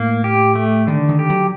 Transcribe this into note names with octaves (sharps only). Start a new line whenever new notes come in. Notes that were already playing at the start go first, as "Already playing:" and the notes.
Already playing: A2 A#3
G4
A3
D3 D#3
D#3
G4
F#3